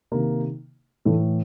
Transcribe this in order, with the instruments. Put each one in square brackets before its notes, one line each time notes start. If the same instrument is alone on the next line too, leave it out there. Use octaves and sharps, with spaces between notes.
[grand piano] C3 D#3 A#3
A2 E3 A3